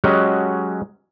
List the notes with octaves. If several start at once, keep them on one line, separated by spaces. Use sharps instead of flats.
F#3 G#3 C#4 F#4 G4 D#5